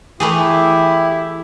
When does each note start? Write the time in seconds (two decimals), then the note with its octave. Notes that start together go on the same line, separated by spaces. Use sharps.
0.20 E3 A3 E4 G4 G#4